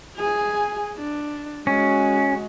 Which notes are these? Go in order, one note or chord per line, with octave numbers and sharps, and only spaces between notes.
G#4 G#5
D4
G#3 C#4 F#4